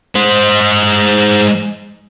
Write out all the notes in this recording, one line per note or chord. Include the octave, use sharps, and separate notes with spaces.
G#3 C5